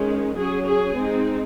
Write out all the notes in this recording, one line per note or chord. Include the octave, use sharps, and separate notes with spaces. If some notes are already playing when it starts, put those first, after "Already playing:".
Already playing: D#3 G#3 C#4
F#3 C#4 G#4
G#4
G#3 C4 D#4